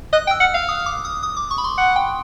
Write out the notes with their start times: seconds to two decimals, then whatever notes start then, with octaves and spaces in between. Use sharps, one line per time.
0.13 D#5 F#6
0.27 G5
0.31 E6
0.40 F#5 F6
0.54 F5
0.69 D#6
0.86 D6
1.05 D#6
1.23 D#6
1.36 D6
1.51 C#6
1.58 B5
1.64 C6
1.78 F#5
1.96 G5